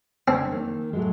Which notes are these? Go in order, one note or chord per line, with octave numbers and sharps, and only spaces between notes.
C4 D4 C#5
D#3 A#3
A2 F#3 G#3